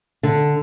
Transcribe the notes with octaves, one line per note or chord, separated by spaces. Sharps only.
D3